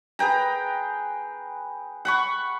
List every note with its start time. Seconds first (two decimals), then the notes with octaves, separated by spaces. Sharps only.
0.19 G#4 B4 G5 A#5
2.05 F#5 B5 C#6